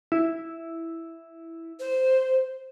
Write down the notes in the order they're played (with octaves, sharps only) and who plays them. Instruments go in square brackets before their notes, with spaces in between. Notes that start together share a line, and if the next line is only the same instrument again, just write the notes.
[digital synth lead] E4
[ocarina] C5